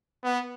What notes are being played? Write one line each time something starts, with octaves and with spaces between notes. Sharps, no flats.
B3